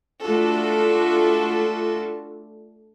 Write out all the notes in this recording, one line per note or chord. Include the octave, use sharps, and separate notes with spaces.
A3 D4 F4 F#4 A4